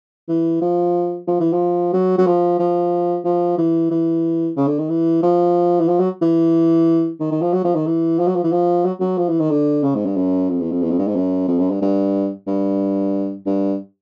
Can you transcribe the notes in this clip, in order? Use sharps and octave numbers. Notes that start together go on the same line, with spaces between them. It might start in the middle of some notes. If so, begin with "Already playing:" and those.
E3
F3
F3
E3
F3
F#3
F#3
F3
F3
F3
E3
E3
C#3
D3
D#3
E3
F3
E3
F3
F#3
E3
D#3
D#3
F3
F#3
F3
D#3
E3
F3
F#3
F3
E3
F3
F#3
F#3
F3
E3
D#3
D3
C#3
G#2
G2
F#2
F2
E2
F2
E2
F2
G2
G#2
F#2
F2
F#2
G2
G2
G2
G2